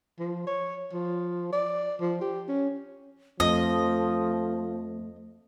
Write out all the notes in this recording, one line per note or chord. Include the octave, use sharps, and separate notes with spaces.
F3
C#5
F3
D5
F3
G4
C#4
F2 F3 A3 D#5